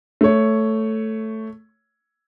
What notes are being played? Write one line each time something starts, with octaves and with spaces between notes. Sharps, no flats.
A3 C#5